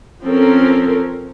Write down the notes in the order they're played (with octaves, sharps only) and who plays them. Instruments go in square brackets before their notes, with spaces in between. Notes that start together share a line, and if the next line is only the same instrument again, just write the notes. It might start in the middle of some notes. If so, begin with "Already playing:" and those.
[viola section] F3 C4 C#4 A4 A#4